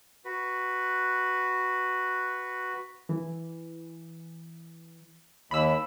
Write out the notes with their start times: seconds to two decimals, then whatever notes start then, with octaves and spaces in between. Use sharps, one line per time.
0.25 F#4 B4
3.09 E3
5.51 D#2 B5 E6